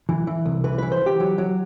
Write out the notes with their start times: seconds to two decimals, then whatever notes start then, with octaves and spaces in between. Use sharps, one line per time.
0.09 E3
0.27 E3
0.45 C2
0.64 E3 B4
0.78 E3 B4
0.92 C5
1.01 E3 G4
1.20 F#3
1.38 F#3